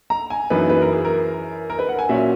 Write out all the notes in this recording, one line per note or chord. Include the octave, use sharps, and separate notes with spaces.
A#5
G#5
F#2 E3 A#3 D#4 B4
B4
A#4
G#4
A#4
A#4
B4
F#5
G#5
A#2 F#3 C#4 E5